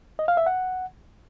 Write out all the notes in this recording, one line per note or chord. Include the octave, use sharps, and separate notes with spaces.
D#5
F5
E5
F#5